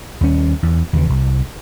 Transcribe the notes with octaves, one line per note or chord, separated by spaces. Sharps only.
D#2 G3 C#4
E2
D#2 C#3 E3
C2